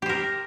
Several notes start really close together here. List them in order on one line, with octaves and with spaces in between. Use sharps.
G4 C5 A#4